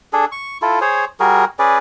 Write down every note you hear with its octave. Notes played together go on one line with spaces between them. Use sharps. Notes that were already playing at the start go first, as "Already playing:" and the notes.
D4 G#4 A4
C#6
E4 F4 A4
G#4 C5 C#5
G3 F#4 G#4 A#4
C#4 G#4 B4 D5